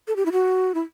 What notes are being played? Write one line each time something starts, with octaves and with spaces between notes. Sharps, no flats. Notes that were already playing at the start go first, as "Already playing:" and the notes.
A4
G4
E4
F#4
E4